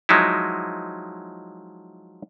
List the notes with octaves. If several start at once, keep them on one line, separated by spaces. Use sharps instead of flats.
F3 F#3 G#3 D#4 E4